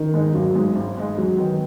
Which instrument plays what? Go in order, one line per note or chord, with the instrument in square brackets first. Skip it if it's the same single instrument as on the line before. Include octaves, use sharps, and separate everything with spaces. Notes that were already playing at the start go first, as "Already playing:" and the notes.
Already playing: [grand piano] D#3
[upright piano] G#2 G#3 D#4
[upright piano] G#1 [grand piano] F#3
[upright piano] G#2 G#3 D#4
G#1
G#2 G#3 D#4
[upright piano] G#2 [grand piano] F#3
[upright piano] D#3 B3 D#4